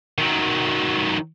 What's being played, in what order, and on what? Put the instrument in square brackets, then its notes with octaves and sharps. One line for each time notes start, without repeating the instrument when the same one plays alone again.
[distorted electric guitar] D#3 F#3